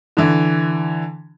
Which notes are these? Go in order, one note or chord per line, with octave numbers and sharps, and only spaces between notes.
D3 E3